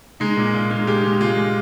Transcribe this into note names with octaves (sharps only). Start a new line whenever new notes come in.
G#3 D#4
A#2
A#2 F4
G#3
G#3 G4
G#3
G#3 F4
G#3